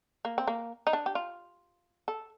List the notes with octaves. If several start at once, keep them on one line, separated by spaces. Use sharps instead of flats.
A#3
C4
A#3
D#4
D4
G4
F4
A4